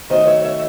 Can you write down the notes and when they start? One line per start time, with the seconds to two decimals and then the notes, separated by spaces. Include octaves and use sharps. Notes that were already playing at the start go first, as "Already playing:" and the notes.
0.10 D#3 F#3 A3 C5 D#5
0.27 C#5 E5
0.45 C#5 E5